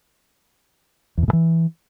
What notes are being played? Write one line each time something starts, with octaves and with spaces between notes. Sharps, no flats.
E2
B2
A2
E3